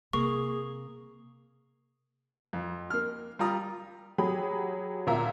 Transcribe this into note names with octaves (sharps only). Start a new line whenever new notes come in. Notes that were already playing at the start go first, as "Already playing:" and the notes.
C3 A#3 G#4 C#6
F2
A#3 F6
G3 F4 A#5 D#6
F#3 G4 G#4 B5
D2 A#2 E5 A#5